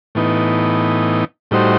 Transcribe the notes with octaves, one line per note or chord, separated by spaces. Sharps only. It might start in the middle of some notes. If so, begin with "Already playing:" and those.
A2 E3 B3 D#4
A2 G3 D#4 F#4 C5